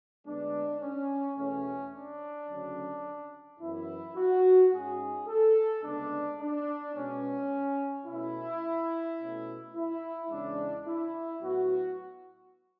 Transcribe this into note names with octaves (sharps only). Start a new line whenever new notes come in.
D2 D3 G#3 B3 D4
C#4
E2 B2 A3 C#4
D4
D2 C#3 F#3 C#4
F#2 E3 B3 E4
F#4
G#2 G#3 C#4 G#4
A4
D2 C#3 G#3 B3 D4
D4
B2 G#3 B3 C#4
B2 A3 C#4 E4
B2 A3 C#4
E4
E2 C#3 G#3 C#4 D4
E4
A2 F#3 B3 F#4